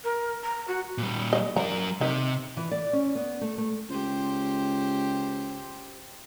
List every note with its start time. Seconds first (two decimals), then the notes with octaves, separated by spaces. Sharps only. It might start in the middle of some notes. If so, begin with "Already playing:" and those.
0.04 A#4
0.43 A#5
0.68 F#4
0.98 A#2 G3
1.33 D#5
1.56 F#3 A#4 A#5
2.01 C3 D#3
2.57 E3
2.71 D5
2.93 C#4
3.15 B3
3.41 A3
3.58 A3
3.89 C#2 G4 C5